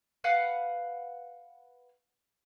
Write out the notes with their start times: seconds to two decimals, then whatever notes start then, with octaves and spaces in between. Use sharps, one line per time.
0.24 B4 F5 F#5